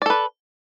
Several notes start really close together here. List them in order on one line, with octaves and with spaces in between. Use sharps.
D5 A4 B4